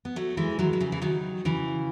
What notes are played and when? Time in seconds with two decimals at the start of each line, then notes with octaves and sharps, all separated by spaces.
0.05 B3
0.16 F#3 A3
0.37 E3 G#3
0.59 D#3 F#3
0.73 F#3
0.80 C#3 E3
0.92 E3
1.02 D#3 F#3
1.45 C#3 E3